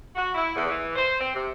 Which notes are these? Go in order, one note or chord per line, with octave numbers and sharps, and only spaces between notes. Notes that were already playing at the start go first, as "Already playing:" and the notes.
F#4
E4
E2
E3
C5
C4
C3